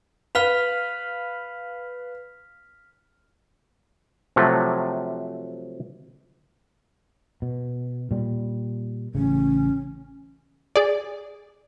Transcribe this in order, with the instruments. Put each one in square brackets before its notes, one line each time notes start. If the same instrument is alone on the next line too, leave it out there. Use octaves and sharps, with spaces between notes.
[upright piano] B4 F5 G7 [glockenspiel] F6 B6 F7
[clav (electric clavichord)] C3 F3 F#3 A3
[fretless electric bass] B2
A#2 G3
[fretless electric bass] A1 C#3 [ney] C#4
[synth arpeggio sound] G#4 D5